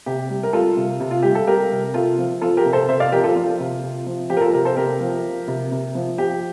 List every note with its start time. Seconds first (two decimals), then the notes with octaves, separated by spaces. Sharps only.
0.06 C3 G4
0.30 G3
0.43 A#4
0.53 G3 F4 A4
0.77 C3
1.00 C3
1.11 F4
1.23 G3 G4
1.35 A4
1.47 G3 G4 A#4
1.71 C3
1.94 C3 F4 A4
2.18 F3
2.41 F3 F4 A4
2.57 G4 A#4
2.65 C3
2.73 A4 C5
2.89 C3 C5 E5
3.00 D5 F5
3.12 F3 G4 A#4
3.24 F4 A4
3.36 F3 F4
3.60 C3
3.82 C3
4.07 F3
4.30 F3 G4
4.37 A#4
4.41 F4 A4
4.53 C3 G4 A#4
4.65 A4 C5
4.77 C3 G4 A#4
5.01 F3
5.24 F3
5.48 C3
5.71 C3
5.95 F3
6.18 F3 G4